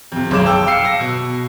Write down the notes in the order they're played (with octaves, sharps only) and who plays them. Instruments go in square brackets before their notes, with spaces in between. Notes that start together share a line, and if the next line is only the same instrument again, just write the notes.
[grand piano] F2 C3
F#1 B1 G#3 D6 E7
G5 A5 E6
F5 E6 C7 C#7
E6 A#6
B2